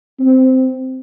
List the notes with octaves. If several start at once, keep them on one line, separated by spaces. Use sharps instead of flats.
C4